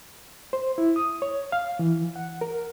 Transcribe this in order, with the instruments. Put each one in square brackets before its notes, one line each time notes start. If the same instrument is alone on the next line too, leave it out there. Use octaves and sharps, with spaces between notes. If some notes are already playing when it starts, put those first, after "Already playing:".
[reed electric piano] C5
E4
D#6
C#5
F5
E3
F#5
A#4